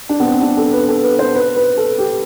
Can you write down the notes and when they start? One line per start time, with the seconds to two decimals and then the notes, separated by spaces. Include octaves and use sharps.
0.09 D4
0.20 B3
0.25 C4
0.42 D4
0.57 A4
0.73 B4
0.89 A4
1.03 B4
1.19 C5
1.35 B4
1.56 B4
1.78 A4
1.98 G4